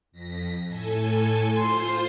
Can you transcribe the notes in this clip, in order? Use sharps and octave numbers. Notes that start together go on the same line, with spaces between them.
F2 A#6 B6
A2 A4 G#5
F4 C5 C6